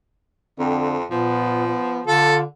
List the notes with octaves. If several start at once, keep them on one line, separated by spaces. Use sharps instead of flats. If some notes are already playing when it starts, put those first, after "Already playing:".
F2 D3 C4
A#2 F3 B3
B3
D3 F4 A4